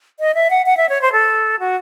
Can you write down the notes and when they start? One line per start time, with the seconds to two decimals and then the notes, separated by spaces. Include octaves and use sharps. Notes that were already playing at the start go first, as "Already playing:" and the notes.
0.20 D#5
0.34 E5
0.50 F#5
0.66 F#5
0.77 E5
0.89 C#5
1.02 C5
1.12 A4
1.59 F#4